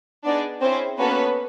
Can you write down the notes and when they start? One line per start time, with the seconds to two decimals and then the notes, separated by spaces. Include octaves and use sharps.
0.24 B3 D4 D#4 G#4 D5
0.61 C4 C#4 E4 G#4 C5
0.98 A#3 B3 C#4 F#4 A4 B4